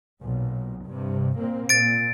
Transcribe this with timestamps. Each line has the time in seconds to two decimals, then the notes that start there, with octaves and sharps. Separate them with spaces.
0.20 B1 A#2
0.86 G2 C3
1.38 A#2 A#3 C4
1.69 A#2 A6 D7